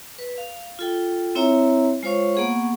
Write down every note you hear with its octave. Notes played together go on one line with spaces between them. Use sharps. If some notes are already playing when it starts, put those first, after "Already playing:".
B4
F5
F4 A4 G5
C4 E4 C#5 E5 A#5
G#3 F4 C5 C#5 F5 C#6
A#3 B3 G#4 F#5 C#6